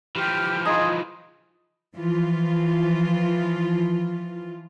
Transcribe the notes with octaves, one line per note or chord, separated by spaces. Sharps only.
E3 F3 G4 F6
D#4 F4 G#4 D#5
E3 F3 F4